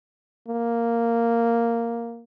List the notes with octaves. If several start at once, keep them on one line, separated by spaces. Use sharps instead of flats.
A#3